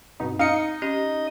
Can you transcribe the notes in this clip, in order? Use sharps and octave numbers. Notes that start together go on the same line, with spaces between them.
G2 B2 C4 D#4
D#4 F5 D#6 C#7
C#4 G4 D#5